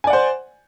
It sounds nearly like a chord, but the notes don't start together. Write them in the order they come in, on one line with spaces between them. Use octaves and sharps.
G#5 D5 F#5 C5